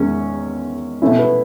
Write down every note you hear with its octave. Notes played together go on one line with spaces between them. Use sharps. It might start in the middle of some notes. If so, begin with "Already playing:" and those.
Already playing: E2 D#3 G#3 C#4
B2 A3 C#4 E4
B3